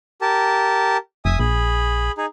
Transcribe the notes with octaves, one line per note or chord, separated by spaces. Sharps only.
G4 A#4 A5
F1 E5 G#5 D#6
A#1 G#4 B5
D#4 G#4